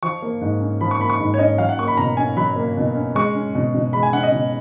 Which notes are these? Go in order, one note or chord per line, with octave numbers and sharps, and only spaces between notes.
F3 C#6
A#3
G#2
C#4
F3 B5
C#6
A#3 B5
C#6
G#2 B5
C#5
C#4 D#5
F#3 F5
F#5
A#3 C#6
B5
B2 A#5
C#4 G#5
F#3 B5
A#3
B2
C#4
G#3 C#6
C#4
B2
B2
G#3 B5
G#5
C#4 F#5
D#5
B2